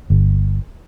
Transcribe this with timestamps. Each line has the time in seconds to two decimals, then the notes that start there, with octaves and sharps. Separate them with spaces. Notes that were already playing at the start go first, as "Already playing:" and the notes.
0.10 G1